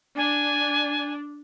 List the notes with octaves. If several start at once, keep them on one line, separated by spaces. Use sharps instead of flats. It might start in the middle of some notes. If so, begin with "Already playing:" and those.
D4 G#5